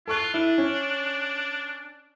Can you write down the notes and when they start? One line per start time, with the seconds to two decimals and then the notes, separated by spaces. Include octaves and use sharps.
0.07 F4 A4 C#6 F#6
0.34 D4 E4
0.58 C#4